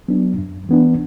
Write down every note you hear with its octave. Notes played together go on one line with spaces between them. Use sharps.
F#3 B3 D4
F#2
E3 B3 D4